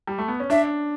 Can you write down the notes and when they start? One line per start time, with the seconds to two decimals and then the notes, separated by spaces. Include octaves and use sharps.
0.07 G3
0.18 A3
0.28 B3
0.40 C#4
0.50 D4 E5